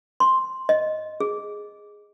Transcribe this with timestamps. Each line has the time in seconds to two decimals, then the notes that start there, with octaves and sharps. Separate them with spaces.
0.20 C6
0.69 D#5
1.20 G#4